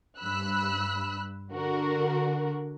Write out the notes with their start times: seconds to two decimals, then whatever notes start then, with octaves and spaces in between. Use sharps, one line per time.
0.19 G2 B5 E6 F#6
1.52 D3 F#4 A#4